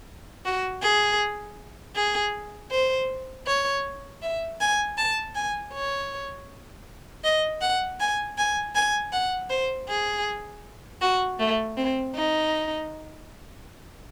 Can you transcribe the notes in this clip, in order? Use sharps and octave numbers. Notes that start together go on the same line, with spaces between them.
F#4
G#4
G#4
C5
C#5
E5
G#5
A5
G#5
C#5
D#5
F#5
G#5
G#5
G#5
F#5
C5
G#4
F#4
A3
C4
D#4